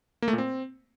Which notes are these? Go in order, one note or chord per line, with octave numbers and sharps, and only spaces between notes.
A#3
A3
A#2
C4